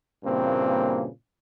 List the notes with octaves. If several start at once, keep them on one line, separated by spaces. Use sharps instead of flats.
G2 A#2 C#3 E3 A#3 C4